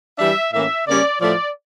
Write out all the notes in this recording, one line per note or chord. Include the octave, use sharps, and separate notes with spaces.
E3 G3 D4 E5
A2 E3 A#3 C#4 E5
C#3 G3 A#3 C#4 D5
A2 F3 A3 D5